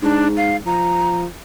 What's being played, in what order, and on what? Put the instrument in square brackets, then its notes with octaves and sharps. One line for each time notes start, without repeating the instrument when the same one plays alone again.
[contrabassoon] G#2 [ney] D4
[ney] F5
[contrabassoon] F3 [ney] A#5